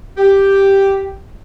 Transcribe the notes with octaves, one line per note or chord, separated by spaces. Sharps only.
G4